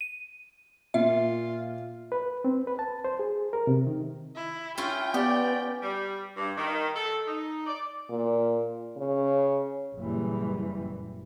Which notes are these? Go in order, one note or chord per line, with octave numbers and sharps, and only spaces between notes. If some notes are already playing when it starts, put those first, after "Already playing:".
D#7
A#2 F4 E5
B4
C4
B4
A5
C5
G#4
A#4
C3
D#3
E4
C#4 E4 F4 G5
B3 G4 D5
G3
G2
D#3
A4
D#4
D5
A#2
C#3
F#1 A#2 E3 G3